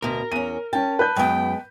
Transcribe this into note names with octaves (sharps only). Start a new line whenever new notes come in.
D2 B2 A#4
E2 C#4 D#7
C#4 G5 A5
B4 G6
F#2 G#3 B3 G5